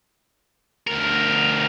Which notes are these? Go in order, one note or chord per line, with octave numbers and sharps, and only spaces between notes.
D2 A#4